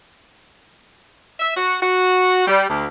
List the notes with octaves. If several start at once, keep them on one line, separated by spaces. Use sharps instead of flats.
E5
F#4
F#4
G3
D2